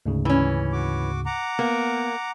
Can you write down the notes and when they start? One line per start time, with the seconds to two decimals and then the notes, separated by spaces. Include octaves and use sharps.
0.06 D2 G#2 C#3
0.25 E3 C#4
0.73 F#4 D6
1.26 F#5 A#5 D6
1.59 A#3 B3